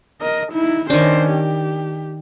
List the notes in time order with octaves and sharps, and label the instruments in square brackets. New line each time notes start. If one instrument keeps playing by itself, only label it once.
[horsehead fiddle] A#4 D#5
D#4 E4
[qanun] D#3 D4 [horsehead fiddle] C#4 C5
[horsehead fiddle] G4